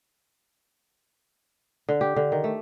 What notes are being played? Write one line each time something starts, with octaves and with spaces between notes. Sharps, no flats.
D3
G4
D3
D#3
A3